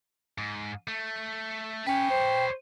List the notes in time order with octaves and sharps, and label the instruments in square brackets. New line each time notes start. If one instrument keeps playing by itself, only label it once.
[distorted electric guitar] G#2
A3
[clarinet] C#4 [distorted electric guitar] B4 C#5 [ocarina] G5
[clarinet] C5